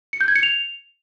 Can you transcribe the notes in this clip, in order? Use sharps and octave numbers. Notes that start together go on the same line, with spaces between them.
C#7
G6
G#6
C#7
F7